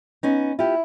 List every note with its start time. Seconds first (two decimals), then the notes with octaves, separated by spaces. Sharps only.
0.23 B3 C#4 D#4
0.59 E4 F4 G4